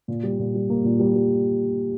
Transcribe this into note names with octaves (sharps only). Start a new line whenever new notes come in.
A#2
G3
A#2
G3
A#3
A#2
G3
G3